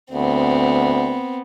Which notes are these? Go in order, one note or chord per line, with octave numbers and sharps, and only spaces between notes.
D2 B3 C4